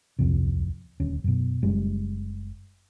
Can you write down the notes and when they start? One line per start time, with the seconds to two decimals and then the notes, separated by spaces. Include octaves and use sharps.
0.19 D1 C2 F2 C3
1.00 D#1 D2 C#4
1.24 F#2 B2
1.62 F#1 G3 G#3 C#4